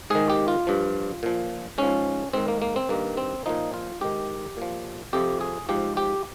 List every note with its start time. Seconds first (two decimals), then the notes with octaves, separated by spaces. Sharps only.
0.10 G#2 D#3 G#4
0.30 G4
0.48 F4
0.67 G2 F3
1.23 A#2 F3
1.78 G#2 F3 C#4
2.33 G#2 D#3 C4
2.48 A#3
2.62 A#3
2.76 C4
2.89 G2 D#3 A#3
3.17 C4
3.46 A#2 F3 D#4
3.74 F4
4.01 G#2 D#3 G4
4.57 A#2 F3
5.13 F2 C3 F3 G4
5.41 G#4
5.69 G#2 F3 G4
5.97 G4